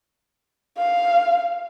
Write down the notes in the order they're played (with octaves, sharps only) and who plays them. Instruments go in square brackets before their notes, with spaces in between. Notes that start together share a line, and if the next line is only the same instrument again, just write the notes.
[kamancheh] F5